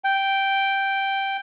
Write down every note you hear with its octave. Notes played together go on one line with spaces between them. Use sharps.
G5